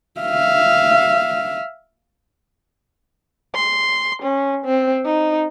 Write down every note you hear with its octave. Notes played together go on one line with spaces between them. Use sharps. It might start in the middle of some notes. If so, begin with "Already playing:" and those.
E5 F5
C6
C#4
C4
D#4